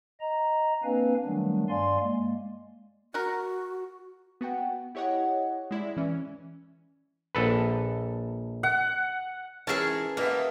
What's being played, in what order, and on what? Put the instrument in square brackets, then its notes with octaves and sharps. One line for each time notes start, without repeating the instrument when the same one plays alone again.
[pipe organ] D#5 A#5
A#3 C4 D4 B4 F5 G#5
D#3 F#3 G3 A3 B3 D4
G2 D5 F5 G#5 C6
G#3 A#3
[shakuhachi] F#4 [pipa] A#4 F#5
[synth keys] B3 F#4 F#5 G5
E4 G4 C#5 D#5 F#5
G#3 E4 D5 E5
E3 C#4
[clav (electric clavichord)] A#1 A4 B4
[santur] F#5
[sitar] G#2 [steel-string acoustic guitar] E3 [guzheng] C#4 A#4 E5 [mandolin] G#4 A5
[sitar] B2 G4 E5 [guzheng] A#3 [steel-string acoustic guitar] B4 D#5 F#5